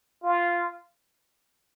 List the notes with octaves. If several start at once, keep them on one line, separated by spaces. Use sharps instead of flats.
F4